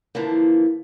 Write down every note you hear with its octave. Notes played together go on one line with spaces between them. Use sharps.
D3 E3 F3 A#3